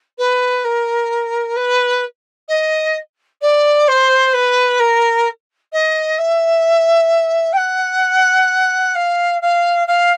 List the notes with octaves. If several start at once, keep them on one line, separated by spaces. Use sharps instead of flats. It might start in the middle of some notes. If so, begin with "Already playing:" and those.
B4
A#4
B4
D#5
D5
C5
B4
A#4
D#5
E5
G5
F#5
F5
F5
F5